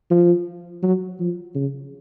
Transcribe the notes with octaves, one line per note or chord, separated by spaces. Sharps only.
F3
F#3
F3
C#3